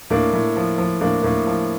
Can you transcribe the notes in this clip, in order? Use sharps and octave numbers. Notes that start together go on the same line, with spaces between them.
A2 A#3 D4
A2
F3
F3
A2 A#3 D4
A2 A#3 D4
F3